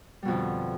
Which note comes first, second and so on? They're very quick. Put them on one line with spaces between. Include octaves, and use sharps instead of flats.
G3 B2 F2 D3